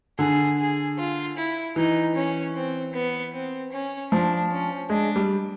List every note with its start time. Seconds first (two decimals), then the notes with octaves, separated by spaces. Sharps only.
0.19 D3 G#4
0.58 G#4
0.98 F4
1.37 E4
1.76 E3 D#4
2.15 C#4
2.55 C4
2.93 B3
3.33 C4
3.72 C#4
4.11 F3 D4
4.51 C#4
4.90 G#3 D4
5.16 G3